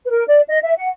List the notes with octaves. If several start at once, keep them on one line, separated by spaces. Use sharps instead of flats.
B4
A#4
D5
D#5
E5
F#5